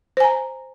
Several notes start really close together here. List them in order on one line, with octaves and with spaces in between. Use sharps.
C5 G#5 A#5